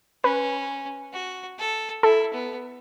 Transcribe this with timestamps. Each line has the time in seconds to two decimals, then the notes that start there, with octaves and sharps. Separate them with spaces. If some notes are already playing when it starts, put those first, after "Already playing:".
0.24 C#4 B4
1.13 F#4
1.59 A4
2.03 E4 A4
2.33 B3